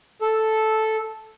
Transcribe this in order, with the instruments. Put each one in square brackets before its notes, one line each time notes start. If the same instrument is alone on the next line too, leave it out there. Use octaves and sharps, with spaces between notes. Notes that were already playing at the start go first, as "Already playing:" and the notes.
[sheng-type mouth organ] A4